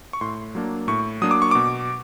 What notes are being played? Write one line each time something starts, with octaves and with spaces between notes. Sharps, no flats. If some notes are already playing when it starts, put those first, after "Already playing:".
C#6
A2 C6
F#3 A#3 D4
A2 C#6
F#3 A#3 D4 D#6
D6
C#6
B2 D6